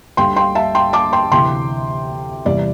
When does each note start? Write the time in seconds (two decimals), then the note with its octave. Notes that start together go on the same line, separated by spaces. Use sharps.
0.17 D2 D3 G3 G5 C6
0.36 G5 C6
0.55 E5 A5
0.75 G5 C6
0.93 A5 D6
1.13 G5 C6
1.32 D2 C3 E3 G5 C6
2.45 E2 C3 G3 D5